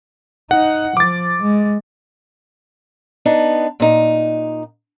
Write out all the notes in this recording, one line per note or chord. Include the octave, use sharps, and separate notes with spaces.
D#4 F#5
F3 D6 A6
G#3
B3 D4 D#4
A#2 D#4